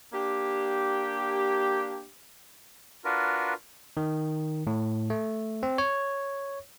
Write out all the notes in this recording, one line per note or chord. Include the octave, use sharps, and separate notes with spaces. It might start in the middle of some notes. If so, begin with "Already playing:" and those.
A#3 D4 G4
D4 F4 F#4 A#4 B4
D#3
A2
A3
C4
C#5